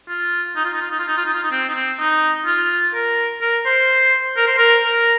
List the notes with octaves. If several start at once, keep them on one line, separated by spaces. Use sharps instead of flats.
F4
D#4
F4
D#4
F4
D#4
F4
D#4
F4
D#4
F4
D#4
C4
D#4
C4
D#4
F4
A#4
A#4
C5
A#4
C5
A#4
A#4